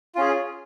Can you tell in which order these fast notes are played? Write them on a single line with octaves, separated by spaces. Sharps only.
F4 C#4 G#4